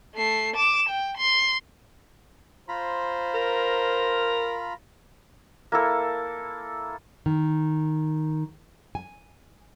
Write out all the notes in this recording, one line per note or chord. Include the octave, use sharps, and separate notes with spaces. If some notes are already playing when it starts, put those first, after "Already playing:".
A3 C7
D6 E7
G5
C6
F4 C5 A#5 B5
A#4
A#3 E4 A4
D#3
G#5